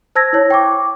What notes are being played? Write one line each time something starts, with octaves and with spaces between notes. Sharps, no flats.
C5 A5 E6 G#6 A#6
E4 C#5
G5 C#6 D6